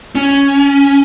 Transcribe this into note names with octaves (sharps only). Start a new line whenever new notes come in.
C#4